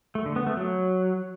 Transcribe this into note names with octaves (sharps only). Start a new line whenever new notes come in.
A3
D3
B3
A3
F#3